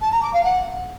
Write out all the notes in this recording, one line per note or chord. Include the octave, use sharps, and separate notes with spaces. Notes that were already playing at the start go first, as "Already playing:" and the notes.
A5
A#5
D6
F5
F#5